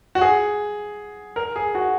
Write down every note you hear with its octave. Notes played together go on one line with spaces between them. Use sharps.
F#4
G#4
A#4
G#4
F#4